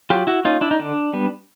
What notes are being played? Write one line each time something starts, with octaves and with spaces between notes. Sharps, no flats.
F#3 F4 G4
E4 F#4
A#3 C#4 D#4 F4
D4 E4
D#4
D3 D4
G3 B3